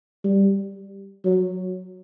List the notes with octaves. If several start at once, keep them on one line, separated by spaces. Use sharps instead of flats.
G3
F#3